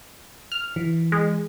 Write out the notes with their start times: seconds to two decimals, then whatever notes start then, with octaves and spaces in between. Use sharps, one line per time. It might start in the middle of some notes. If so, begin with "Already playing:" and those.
0.52 F6
0.76 E3
1.12 G#3